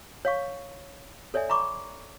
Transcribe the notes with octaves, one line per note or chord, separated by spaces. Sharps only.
C#5 F5 C#6
A4 C#5 D5 E5 G#5
A#5 B5 C#6 D6